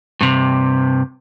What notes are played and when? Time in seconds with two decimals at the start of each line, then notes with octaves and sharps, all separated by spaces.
0.21 G2 C3